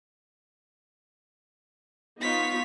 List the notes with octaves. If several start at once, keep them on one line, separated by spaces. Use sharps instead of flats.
B3 D#4 F4 C#5 B6